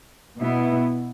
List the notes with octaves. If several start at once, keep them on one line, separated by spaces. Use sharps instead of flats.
B2 B3 E4